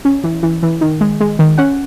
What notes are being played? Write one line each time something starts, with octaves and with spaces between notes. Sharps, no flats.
C#4
E3
E3
E3
D#3
G#3
G#3
D#3
C#4 F#5